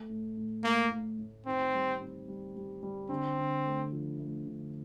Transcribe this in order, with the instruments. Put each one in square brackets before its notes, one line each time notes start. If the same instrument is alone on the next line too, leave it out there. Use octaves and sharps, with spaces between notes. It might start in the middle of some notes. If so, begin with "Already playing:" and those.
Already playing: [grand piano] A3
A2
A2
[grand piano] A3 [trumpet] A#3
[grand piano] A2
A2
[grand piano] D#3 [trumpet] C4
[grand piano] G3
C4
G3
G3
G3
[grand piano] D3 [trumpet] C4
[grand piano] D3
A3
F3
A3
D3